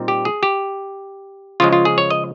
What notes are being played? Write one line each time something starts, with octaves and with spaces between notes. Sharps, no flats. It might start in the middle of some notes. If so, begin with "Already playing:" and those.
Already playing: A#2 G3 C4 D#4
G4
G#4
G4
C#3 F3 G#3 F4
F4
G#4
C#5
D#5